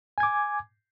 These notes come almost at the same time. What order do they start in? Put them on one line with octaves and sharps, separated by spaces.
G#5 G#6 D6